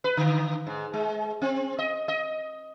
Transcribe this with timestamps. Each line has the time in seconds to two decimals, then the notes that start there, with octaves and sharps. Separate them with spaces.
0.04 B4
0.17 D3
0.67 G#2
0.93 G#3
1.42 C4
1.78 D#5
2.08 D#5